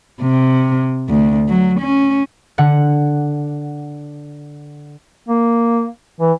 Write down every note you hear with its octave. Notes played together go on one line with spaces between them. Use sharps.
C3
D2
F#3
C#4
D3 F#5
A#3
E3